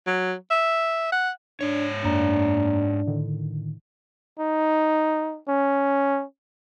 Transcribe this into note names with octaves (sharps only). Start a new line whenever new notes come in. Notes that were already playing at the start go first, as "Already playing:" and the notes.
F#3
E5
F#5
G#2 D4 C#5
F#2 A#3 D4 A#5
A2 D3 D#3
D#4
C#4